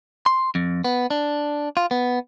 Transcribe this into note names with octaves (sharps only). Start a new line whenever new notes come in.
C6
F2
B3
D4
F4
B3